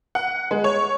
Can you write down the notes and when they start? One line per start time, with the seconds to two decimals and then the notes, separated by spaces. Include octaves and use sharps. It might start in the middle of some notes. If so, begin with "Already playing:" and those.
0.15 F#5
0.51 G#3
0.64 C#5